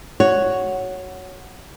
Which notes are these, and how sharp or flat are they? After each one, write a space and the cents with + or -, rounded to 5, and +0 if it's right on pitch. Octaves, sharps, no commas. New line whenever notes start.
F#4 +0 C#5 +0